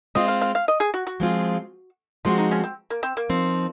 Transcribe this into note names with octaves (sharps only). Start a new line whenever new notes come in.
G#3 C4 F4 D#5
F5
F5
F5
D#5
G#4
F#4
F#4
F3 G#3 C4 F4 G#4
F3 G#3 C4 F4 F#4
D#4
C#4
C4
A#3
C4
A#3
F3 C4 D#4